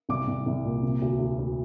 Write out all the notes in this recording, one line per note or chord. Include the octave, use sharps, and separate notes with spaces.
C2 D6
C2
C2
A#2
C3
D2
D2
D2